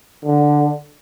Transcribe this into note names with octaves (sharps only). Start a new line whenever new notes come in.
D3